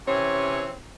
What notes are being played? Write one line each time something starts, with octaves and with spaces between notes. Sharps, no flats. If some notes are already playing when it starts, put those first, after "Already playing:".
C3 E3 C4 C#4 C#5